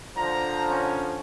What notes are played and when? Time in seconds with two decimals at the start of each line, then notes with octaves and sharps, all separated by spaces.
0.17 D3 F3 A#5
0.71 C#4